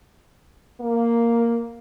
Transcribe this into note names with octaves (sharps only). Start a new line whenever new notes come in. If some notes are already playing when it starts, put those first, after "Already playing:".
A#3